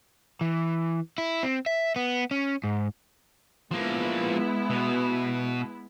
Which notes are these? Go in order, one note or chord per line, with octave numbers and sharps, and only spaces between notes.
E3
E4
C4
E5
B3
C#4
G#2
F3 G#3 A#3 B3 E4
B2